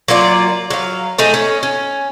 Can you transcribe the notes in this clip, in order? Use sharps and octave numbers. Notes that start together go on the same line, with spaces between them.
F#3 A#3 F4 D5
F#3 F5
A3 D#4 G#4
C#4
C#4